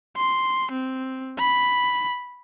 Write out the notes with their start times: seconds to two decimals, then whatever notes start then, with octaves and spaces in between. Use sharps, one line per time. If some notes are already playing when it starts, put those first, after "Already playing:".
0.17 C6
0.71 C4
1.39 B5